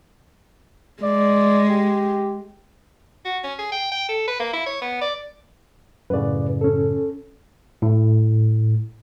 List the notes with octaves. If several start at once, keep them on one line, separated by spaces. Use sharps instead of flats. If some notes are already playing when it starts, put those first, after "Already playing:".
G#3 D5
G4
F#4
C#4
G#4
G5
G5
A4
B4
A#3
E4
C#5
B3
D5
F#2 A2 C#3 B4 D5
C#4 A4
A2